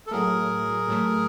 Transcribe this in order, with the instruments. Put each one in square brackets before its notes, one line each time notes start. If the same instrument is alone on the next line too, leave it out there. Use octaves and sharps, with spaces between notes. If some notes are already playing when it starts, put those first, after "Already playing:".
[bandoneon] A4
[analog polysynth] A2 F#3 A3 [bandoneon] G#4 A#4
[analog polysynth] A2 F#3 A3